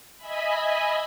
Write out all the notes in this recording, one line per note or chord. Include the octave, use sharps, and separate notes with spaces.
D#5 E5 G#5 B5